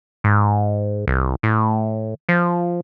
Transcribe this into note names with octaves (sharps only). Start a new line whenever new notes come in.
G#2
C2
A2
F3